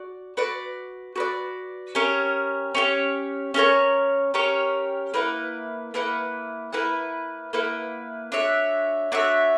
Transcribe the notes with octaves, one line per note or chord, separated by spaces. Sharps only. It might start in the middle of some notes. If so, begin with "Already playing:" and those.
Already playing: F#4 D5
F#4 B4 D5
F#4 B4 D5
C#4 G4 A#4 C#5
C#4 G4 A#4 C#5
C#4 G4 A#4 C#5
C#4 G4 A#4 C#5
A#3 E4 B4 F#5
A#3 E4 B4 F#5
A#3 E4 B4 F#5
A#3 E4 B4 F#5
D4 F#4 C#5 E5
D4 F#4 C#5 E5